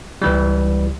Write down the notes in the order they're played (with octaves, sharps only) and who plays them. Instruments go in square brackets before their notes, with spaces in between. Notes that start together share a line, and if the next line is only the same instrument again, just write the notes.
[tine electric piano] C#2 E3 G3